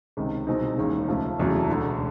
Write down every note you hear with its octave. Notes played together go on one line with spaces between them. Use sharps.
C#2 C3 D#3
C2 B2 G#3 C4 D#4
E1 D#2 C#3
C#2 C#3 F3 A3
F1 E2 C#3 F#3 A3
E1 D2 D3